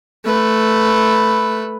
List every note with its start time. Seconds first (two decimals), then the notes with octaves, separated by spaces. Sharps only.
0.25 A3 B4